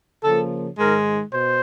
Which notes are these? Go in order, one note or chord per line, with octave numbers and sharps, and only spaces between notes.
C#3 F3 A#3 A4
G#2 D#3 G#3 A#4
B2 C5